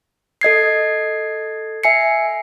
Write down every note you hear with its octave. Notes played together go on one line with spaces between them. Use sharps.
A4 D#5 G#6 C7
E5 G#5 C7 C#7